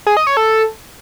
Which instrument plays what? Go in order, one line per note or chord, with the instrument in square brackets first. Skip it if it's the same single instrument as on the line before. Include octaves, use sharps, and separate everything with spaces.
[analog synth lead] G#4
D#5
C#5
A4